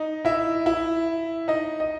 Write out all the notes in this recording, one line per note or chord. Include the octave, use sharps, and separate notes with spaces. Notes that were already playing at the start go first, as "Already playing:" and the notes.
Already playing: D#4 D#5
E4 E5
E4 E5
D#4 D#5
D#5